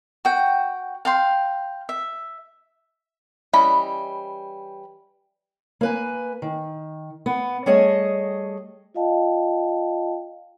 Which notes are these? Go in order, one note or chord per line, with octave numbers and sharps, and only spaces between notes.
F#4 G5
F5 G5 C6
E5
E3 G3 C#4 D#5 B5
A#3 B4 G#5
D#3
B3
G3 A3 G#4 C#5 D#5 A5
F4 D5 D#5 F5 G5 A5